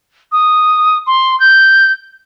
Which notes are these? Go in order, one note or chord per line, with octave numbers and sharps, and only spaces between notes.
D#6
C6
G6